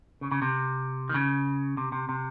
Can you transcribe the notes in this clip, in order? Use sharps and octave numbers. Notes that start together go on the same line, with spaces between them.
C#3
C#3
C3
D#3
C#3
C3
C3
C3